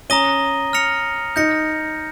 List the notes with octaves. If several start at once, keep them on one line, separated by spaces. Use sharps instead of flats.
C#4 A#5 D#6 A#6 D#7 G7
F6 A#6 C#7 F7
D#4 G6 A#6 C#7